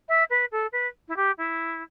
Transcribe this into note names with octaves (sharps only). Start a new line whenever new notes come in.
E5
B4
A4
B4
E4
G4
E4